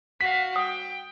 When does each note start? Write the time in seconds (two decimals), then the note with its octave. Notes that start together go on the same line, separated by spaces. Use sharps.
0.21 F#4 F5 B6
0.56 G5 D#6